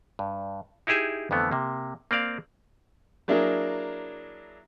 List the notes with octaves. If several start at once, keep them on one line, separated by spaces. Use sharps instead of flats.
G2
D#4 E4 G4 G#4 E5
F2 D3 E3 A3 B3
C3 A#3
A#3 C4 D5 F5
F#3 A#3 D4 E4 G#4 A#4